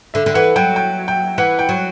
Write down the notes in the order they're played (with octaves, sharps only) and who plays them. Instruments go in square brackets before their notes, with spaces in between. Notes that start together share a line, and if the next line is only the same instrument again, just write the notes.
[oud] D3 [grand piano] E5
[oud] D3
[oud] E3 [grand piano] F#5
[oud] F#3 [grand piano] G5
[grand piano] G5
G5
[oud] E3 [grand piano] F#5
[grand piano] G5
[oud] F#3